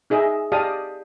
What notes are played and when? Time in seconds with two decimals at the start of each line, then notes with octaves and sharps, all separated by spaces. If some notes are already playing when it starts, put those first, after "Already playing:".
0.10 D#4 G#4 D#5 E5
0.52 G4 D5 D#5 F5 A5 D#6